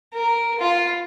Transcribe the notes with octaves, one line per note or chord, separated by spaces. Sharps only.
A#4
F4